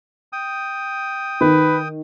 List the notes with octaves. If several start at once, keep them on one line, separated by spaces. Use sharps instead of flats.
G5 D#6
D#3 B4